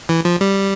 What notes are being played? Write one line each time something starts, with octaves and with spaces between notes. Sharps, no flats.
E3
F3
G3